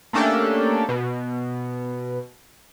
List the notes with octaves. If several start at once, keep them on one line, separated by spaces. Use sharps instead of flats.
A3 A#3 C#4 D4 G4 A4
B2